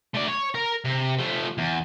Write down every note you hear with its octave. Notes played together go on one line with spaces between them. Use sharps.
A3 D5
C#5
A#4 A#5
C3
F3 A3
E2